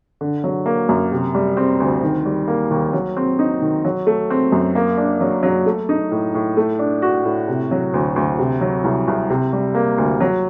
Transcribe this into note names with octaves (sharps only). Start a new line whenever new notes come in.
D3
F#3
A#3
F#2
C3
G3
C4
D2
D#3
G3
A#3
D#2
F#3
C4
D#4
D#3
F#3
A3
C4
F#2
A#3
D4
F#3
F#3
A3
D#4
A2
A2
A3
D4
F#4
A2
C3
F#3
D2
D2
C3
F#3
C2
C2
C3
G3
A#3
D2
F#3